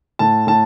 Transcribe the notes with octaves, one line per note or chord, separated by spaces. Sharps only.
A2 A5
A2 A5